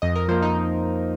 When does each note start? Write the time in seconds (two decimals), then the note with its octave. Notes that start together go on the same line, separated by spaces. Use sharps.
0.02 F2 D#5
0.15 A#4
0.28 F3 A#3 C5
0.42 D#4